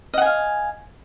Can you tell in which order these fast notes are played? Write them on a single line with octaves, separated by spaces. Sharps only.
D#5 F#5 G#5 F5